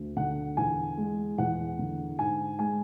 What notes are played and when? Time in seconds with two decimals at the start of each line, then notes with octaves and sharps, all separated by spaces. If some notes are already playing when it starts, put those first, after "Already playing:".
Already playing: D2
0.17 D3 F#5
0.57 E2 G#5
0.97 G#3
1.38 E2 F#5
1.79 D3
2.19 G#2 G#5
2.59 G#3 G#5